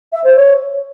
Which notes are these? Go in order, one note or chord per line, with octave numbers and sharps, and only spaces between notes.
E5
C5
C#5